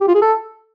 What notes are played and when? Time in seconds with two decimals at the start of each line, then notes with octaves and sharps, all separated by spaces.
0.01 G4
0.08 F4
0.15 G#4
0.22 A4